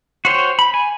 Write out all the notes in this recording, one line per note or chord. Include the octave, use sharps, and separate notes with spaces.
F#4 C5 C#5 G5
B5
G#5